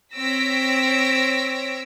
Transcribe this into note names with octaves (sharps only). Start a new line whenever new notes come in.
C4 C#5 E6 A#6 B6 D7